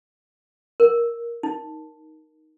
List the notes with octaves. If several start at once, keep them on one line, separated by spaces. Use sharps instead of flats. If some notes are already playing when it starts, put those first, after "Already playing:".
A#4
D#4